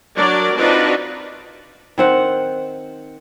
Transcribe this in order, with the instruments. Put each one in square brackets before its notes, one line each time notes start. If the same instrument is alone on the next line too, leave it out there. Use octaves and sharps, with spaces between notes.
[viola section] F#3 D4 A#4 D5
C4 D4 D#4 F4 F#4 B4
[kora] D#3 C4 F#5